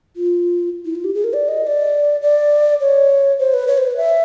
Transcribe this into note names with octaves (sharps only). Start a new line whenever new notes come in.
F4
E4
F4
G4
G#4
A#4
D5
D#5
D#5
D5
D5
C#5
C5
B4
C#5
C5
B4
E5